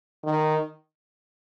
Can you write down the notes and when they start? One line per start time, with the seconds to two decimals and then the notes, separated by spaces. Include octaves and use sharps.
0.25 D#3